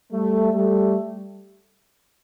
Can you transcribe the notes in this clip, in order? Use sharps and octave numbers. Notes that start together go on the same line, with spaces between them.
G3 A3
G3 A3